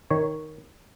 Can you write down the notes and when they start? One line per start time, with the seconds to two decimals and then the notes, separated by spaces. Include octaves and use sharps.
0.10 D#3 C#5